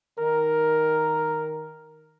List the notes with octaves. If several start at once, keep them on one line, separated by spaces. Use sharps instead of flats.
D#3 A#4